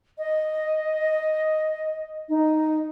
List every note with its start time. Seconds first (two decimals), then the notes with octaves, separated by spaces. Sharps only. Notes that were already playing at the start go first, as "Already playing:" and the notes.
0.18 D#5
2.29 D#4